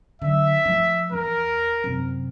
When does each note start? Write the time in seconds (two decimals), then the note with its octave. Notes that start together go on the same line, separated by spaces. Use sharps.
0.22 D3 F#3 E5
0.65 F3 A3
1.12 E2 A#4
1.84 F#2 C3